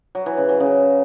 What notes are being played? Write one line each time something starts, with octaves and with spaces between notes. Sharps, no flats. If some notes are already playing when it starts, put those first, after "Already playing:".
F#3
E3
C#3
F#3
C#3